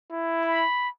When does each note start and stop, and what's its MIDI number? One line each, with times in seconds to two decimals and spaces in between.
0.12 0.66 64
0.43 0.89 83